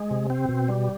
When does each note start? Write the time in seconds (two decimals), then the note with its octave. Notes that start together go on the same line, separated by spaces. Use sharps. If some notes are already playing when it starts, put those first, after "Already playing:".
Already playing: G#3
0.11 C3
0.30 C4
0.49 B2
0.68 G3